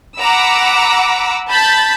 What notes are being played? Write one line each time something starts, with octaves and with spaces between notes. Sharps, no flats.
F#5 A#5 B5 D6 E6
A5 B5 G6 A6 B6